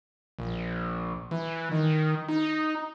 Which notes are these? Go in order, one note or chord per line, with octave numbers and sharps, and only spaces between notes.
A#1
E3
D#3
D#4